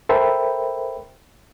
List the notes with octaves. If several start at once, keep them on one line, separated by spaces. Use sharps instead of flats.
A4 A#4 C5 E5 G5 B5